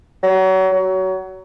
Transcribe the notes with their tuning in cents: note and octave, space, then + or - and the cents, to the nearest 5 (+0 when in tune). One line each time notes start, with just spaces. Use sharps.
F#3 +30
F#3 +25